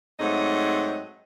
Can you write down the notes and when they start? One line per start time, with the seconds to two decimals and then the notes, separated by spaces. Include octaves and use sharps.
0.19 G#2 F#3 A3 C4 D#5